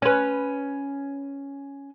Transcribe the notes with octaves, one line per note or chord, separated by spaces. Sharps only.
C#4 B4